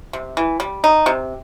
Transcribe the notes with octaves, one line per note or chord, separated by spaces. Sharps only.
C3
E3
G3
D#4
C3